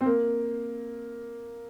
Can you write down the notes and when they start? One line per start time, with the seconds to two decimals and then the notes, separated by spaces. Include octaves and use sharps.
0.01 C4
0.06 A#3